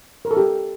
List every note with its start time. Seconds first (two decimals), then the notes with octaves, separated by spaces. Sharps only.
0.25 A#4
0.31 A4
0.37 G4